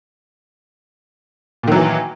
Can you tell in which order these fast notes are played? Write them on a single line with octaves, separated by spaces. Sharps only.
A#2 D#3 F#3 E3